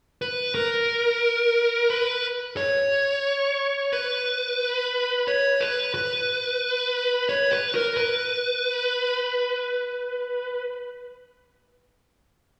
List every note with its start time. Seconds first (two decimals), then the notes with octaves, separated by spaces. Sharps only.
0.22 B4
0.55 A#4
1.90 B4
2.57 C#5
3.93 B4
5.28 C#5
5.61 B4
5.94 B4
7.29 C#5
7.52 B4
7.75 A#4
7.97 B4